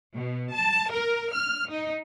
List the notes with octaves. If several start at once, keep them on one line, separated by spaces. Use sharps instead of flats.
B2
A5
A#4
F6
D#4